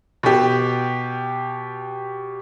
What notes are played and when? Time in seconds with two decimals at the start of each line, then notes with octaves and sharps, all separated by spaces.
0.23 B2 G4